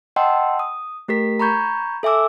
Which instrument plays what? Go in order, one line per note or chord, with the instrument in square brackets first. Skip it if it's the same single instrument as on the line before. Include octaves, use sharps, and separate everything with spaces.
[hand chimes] D#5 F#5 G5 A5 C6 E6
D#6
A3 G4 A#4 B6
A#5 B5 C#6 G6 G#6
A4 E5 G#5 D6 E6